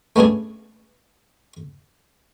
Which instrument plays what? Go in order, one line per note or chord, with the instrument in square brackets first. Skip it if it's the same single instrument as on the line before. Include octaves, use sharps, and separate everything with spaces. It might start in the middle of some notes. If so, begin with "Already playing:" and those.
[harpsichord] A3 B3 C#4 D4 G#4